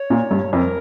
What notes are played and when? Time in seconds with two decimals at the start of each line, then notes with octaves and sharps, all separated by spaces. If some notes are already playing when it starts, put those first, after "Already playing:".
Already playing: C#5
0.10 A#2
0.31 G2
0.53 F2 A#4